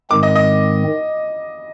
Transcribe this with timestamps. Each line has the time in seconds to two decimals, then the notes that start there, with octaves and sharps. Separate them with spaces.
0.10 G#2 D#3 G#3 C4 D6
0.23 D#5
0.36 D#5